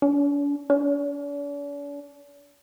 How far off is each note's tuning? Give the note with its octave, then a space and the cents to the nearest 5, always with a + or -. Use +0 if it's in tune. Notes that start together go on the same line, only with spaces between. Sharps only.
D4 -45
D4 -45